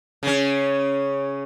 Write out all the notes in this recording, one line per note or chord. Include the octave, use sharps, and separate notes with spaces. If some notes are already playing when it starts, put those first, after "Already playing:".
C#3 C#4